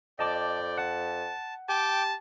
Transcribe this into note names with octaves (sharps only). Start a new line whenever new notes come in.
F2 D5 D#5 G5 A5 D6
F#5 A5
G4 G5 A5 D6